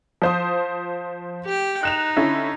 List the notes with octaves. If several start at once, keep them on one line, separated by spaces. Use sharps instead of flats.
F3 C5 D#6
G4 G5
D#4 F#6 E7 F7
D3 C#4 E4